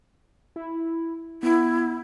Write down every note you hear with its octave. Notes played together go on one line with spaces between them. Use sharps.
E4
B3 E4